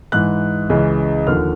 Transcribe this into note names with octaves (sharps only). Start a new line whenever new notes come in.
G#2 E3 F#6
C#2 C#3 E3
D#2 D3 F3 F6